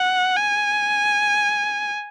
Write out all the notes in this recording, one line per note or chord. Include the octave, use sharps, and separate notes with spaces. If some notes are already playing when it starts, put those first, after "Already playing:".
Already playing: F#5
G#5